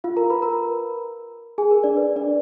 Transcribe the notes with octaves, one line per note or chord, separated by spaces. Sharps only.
F4 F5
A#4 A#5
B4 B5
A#4 A#5
G#4 G#5
A#4
D4 D5
B4
D4 D5